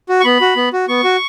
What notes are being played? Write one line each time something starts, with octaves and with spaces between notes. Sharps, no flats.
F#4
C#6
B3 B5
F#4
B3
F#4
B3 C#6
F#4